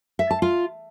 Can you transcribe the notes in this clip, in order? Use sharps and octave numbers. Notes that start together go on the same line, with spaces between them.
E5
A5
F4